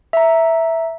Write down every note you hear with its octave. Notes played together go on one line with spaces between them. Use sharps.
E5 A#5